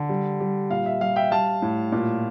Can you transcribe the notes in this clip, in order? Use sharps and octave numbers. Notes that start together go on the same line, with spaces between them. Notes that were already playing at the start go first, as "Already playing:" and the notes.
Already playing: D3
G3
G3
A#2 F5
E5
G3 F5
E5 G5
G3 F5 A5
A2
A#2